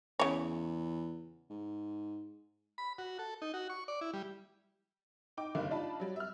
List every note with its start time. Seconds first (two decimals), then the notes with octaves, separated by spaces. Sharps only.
0.20 E2 C#3 C#5
1.50 G#2
2.78 B5
2.98 F#4
3.19 A4
3.42 D#4
3.54 F#4
3.70 C#6
3.88 D5
4.01 E4
4.13 G3
5.37 D#4 G5 D6
5.55 F#1 G2 D3 D#3 F5
5.70 D4 D#4 F4 A5 B5
6.00 F#3 G3
6.16 E5 F6